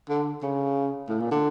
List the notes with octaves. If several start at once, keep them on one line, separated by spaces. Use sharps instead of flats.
D3
C#3
A2
A#2
D3